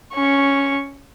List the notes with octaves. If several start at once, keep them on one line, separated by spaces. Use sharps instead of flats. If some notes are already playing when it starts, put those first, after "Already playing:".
C#4 C#6